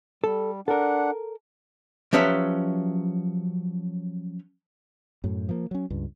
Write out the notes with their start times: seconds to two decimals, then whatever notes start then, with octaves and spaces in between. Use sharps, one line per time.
0.24 G3 A4
0.68 D4 A4 A#4 F#5
2.13 F3 F#3 C#4 G4 B4 E5
5.24 F#2 A2
5.49 F3 A#3
5.71 F#3 C#4
5.90 C#2 G2